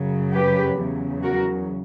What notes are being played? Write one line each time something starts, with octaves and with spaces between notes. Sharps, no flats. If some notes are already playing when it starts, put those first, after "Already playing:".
Already playing: F#2 C#3 F#3
G4 B4
E2 C#3 F#3
F#4 A#4